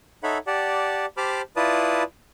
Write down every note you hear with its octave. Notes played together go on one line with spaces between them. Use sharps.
D#4 A4 C#5 E5 F#5 B5
G4 D5 F#5 A5
G4 C5 A5 B5 D6 F6
E4 F4 B4 D5 A5 D#6